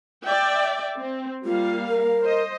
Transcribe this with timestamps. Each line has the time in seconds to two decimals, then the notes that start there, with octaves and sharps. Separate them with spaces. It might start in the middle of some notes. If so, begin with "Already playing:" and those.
0.23 D5 E5 G5
0.99 C4
1.45 G3 A#3 F4 F5
1.87 A#4
2.23 C5 D#5